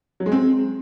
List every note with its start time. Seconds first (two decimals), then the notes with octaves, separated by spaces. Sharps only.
0.20 F#3
0.26 G#3
0.32 C4